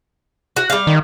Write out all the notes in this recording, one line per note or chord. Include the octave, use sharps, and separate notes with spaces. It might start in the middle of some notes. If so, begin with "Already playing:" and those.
F#4
G3 F5
D#3